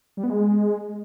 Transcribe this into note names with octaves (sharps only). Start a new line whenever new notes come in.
G3
B3
G#3